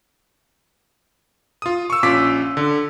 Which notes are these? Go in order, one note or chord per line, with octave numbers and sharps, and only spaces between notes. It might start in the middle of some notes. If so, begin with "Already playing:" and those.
F4 D#6
C#6 E6
A#1 C#4 F4 D6 B6
D3